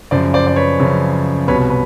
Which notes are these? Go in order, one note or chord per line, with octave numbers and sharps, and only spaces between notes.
F#2 C#3 F3 C5 D5
C5 D5
D5
B4 C#5
F#2 C#3 F3
C2 B2 B4 C#5
B4